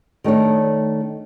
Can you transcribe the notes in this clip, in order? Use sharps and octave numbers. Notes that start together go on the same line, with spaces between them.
D#3 A3 D4 C#5